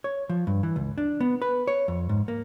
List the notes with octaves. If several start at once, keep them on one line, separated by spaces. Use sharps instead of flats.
C#5
F3
G2
E3
C#2
D4
B3
B4
C#5
F2
G#2
A#3